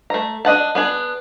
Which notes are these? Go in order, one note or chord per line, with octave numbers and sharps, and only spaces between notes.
A3 A#5
D4 D#5 F#5 A5
B3 D4 G#4